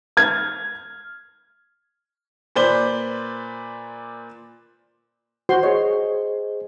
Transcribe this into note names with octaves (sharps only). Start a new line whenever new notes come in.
F6 G#6
A#2 B4 C5 D5 G6 G7
F#4 C5 C6
G#4 C5 C#5 D#5